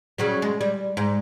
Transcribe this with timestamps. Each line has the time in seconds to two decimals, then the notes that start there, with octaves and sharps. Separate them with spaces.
0.18 C#3 F#3 G3
0.42 G#3
0.61 G3
0.97 G#2